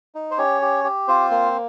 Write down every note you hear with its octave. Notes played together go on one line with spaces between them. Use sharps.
D#4
C5
C#4 G4 C#5
G4
G4
C4 F4 C5
A#3